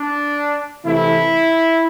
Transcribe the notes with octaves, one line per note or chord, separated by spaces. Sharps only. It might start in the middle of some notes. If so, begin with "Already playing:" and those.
Already playing: D4
C3 E3 A3 E4